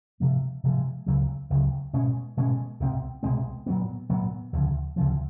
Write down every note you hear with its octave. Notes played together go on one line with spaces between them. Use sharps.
C3 F3 G#3
C3 F3 G#3
C#2 C#3 F#3
C#2 C#3 F#3
B2 G#3 C#4
B2 G#3 C#4
C2 B2 G#3 C4
C2 B2 G#3 C4
A#2 F#3 B3
A#2 F#3 B3
D2 C#3 F3
D2 C#3 F3